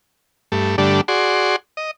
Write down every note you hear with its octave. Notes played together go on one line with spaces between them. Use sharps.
G2 A3
G2 D3 G3 A3 D4
F#4 G#4 D5 C6
D#5